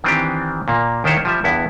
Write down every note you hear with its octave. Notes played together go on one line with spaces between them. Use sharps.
D#3 E3 C4 D4 G4
A#2 A#3
D#2 D#3 D4 E4 C5 C#5
F3 G3 E5
E2 G2 B3 E4